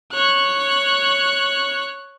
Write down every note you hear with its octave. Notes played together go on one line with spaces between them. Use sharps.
C#5 F#6